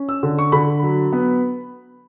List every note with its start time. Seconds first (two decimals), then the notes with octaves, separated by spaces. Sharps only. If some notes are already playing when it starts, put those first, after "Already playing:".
Already playing: C#4
0.09 E6
0.23 D3
0.39 C#6
0.52 D3 B5
0.83 F#3
1.13 B3